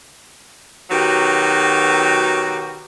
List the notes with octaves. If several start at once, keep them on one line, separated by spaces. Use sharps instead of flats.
B2 D#3 F#3 F#4 G4 B4